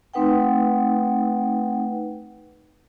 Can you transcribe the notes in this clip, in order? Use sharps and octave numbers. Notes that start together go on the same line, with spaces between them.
A3 C4 D#4 B4 F#5 G5